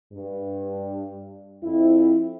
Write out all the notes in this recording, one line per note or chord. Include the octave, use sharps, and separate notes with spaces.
G2
F2 C4 E4